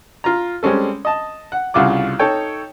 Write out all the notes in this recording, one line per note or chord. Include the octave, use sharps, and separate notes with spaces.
F4 A#5
G3 G#3 C4 C#4 A4
D#5 A5
F#5
C2 C#3 F4 F#5 D6
D#4 A4 C#5 G5